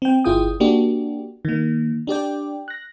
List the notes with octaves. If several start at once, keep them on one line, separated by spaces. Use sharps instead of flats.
C4 G5
G1 E4 F4 G#4 G5 D#6
A#3 D4 F#4 G4
D#3 A#3
D4 G4 D5 G5
F#6 A#6